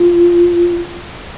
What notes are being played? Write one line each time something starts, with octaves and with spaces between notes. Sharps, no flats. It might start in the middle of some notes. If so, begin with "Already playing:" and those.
Already playing: F4